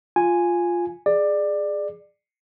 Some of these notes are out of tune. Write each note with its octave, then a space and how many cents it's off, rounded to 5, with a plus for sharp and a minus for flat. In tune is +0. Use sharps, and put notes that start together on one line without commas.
F4 +0 G#5 +0
G#4 +0 D5 +15